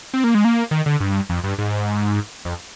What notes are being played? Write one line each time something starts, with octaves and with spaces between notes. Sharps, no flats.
C4
A#3
G#3
A#3
D#3
D3
G2
F2
G2
G#2
F2